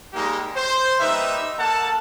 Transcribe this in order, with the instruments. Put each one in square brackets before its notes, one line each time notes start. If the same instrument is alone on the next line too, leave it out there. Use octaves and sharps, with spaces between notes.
[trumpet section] G3 G#3 A#3 D#4 G4
C5
G3 A#3 D#4 B4 E5
A#3 A4 F#5 A5